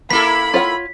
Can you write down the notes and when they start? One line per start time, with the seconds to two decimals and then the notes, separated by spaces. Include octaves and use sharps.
0.11 A#3 E4 A4 B5 B6
0.54 F4 C#5 F#5